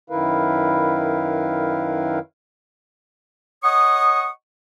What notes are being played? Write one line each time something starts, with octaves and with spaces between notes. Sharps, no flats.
F#2 D#3 E4 A#4 B4 F5
C#5 D#5 F#5 C#6 D#6